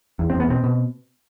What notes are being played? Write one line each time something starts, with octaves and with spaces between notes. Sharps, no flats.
E2
E2 C4
B3
B2 C4
B2